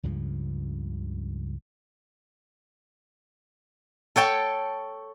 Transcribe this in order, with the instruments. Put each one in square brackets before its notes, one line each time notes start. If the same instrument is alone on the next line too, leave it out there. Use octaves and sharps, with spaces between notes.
[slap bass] C#2 G2 C#3 F3
[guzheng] A4 C#5 G5 A5